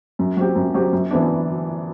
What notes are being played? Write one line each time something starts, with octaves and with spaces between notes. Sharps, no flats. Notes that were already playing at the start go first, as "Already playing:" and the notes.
F#2
F#3 C4 G4
F#2
F#3 C4 G4
F#2
E3 B3 D4